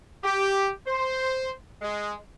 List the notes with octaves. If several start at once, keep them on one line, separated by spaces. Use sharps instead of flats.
G4
C5
G#3